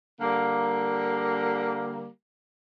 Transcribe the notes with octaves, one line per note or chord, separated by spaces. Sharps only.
D3 G3 A#3